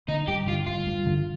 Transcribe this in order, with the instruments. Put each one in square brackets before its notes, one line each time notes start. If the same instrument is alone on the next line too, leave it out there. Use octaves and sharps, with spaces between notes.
[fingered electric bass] D3 [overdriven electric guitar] D#4
[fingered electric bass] G2 [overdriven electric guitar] G4
[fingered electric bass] D3 [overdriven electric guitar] F4
[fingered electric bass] G2 [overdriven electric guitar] F4
[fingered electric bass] G2
D3